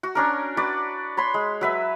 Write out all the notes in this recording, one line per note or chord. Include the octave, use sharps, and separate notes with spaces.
F#4
C#4 D4 A#4
F#4 B4 D5
C#5 B5 C6
G#3
F#3 B4 E5